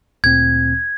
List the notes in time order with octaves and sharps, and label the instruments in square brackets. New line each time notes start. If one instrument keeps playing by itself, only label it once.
[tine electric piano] D2 A#2 C4 [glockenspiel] G#6